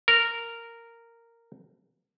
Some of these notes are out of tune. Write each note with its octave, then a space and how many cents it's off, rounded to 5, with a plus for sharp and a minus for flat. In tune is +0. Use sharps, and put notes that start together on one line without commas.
A#4 -10